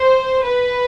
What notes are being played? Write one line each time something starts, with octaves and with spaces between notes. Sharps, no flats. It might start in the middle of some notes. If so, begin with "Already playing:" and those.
Already playing: C5
B4